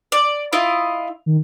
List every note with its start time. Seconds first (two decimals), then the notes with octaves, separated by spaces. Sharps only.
0.12 D5
0.53 E4 F4 D#5
1.26 D#3